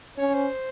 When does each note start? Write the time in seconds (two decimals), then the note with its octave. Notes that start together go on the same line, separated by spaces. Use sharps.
0.18 C#4 C#5
0.34 C5